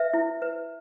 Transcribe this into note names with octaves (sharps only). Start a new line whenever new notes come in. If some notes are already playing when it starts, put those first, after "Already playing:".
Already playing: B4 E5
E4
B4